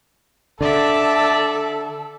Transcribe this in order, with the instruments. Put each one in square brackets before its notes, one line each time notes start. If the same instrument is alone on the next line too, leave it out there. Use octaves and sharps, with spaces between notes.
[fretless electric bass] D3 [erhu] A4 [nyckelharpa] D5 E5 [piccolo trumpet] A5